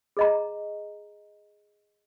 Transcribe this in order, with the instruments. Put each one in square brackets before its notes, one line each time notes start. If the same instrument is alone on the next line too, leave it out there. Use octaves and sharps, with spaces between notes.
[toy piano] G#4 D#5 A#5